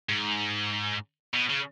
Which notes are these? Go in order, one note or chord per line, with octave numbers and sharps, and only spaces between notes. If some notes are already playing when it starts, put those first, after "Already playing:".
G#2
B2
C#3